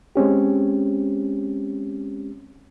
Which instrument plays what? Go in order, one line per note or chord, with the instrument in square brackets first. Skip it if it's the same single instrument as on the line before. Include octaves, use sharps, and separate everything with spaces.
[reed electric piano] G#3 C4 C#4 G4